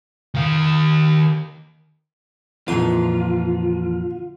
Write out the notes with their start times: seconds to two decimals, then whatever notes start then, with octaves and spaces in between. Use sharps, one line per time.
0.35 D#3 F5
2.68 F2 A#2 D3 E3 F4 D#6